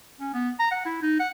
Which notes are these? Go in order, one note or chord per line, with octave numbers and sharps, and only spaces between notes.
C#4
B3
A#5
F#5
E4
D#4
F#5